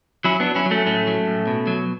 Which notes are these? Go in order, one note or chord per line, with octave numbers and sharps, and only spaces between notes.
F#3 C#4 E4
B3 D4
F#3
C#4 E4
F#3
A3 C#4
A2 A3 C#4
F#3
A2
B2
F#3